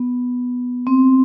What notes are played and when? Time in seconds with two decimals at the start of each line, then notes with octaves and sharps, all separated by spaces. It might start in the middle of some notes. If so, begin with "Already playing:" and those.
Already playing: B3
0.87 C4